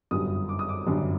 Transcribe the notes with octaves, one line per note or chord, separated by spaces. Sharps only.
G1 F#2 D3 G3 D#6
D6
D#6
D6
G1 F#2 D3 G3